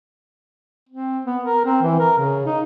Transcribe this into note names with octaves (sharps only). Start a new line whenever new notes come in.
C4
B3
A#4
C4
E3
A#4
C#3
D#4